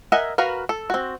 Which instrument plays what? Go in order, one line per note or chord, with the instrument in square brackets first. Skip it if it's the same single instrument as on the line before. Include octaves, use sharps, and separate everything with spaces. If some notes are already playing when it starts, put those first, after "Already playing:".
[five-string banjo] A#4 D#5 E5 F#5 G#5
F#4 A#4 B4 F5
A4
C4 F#4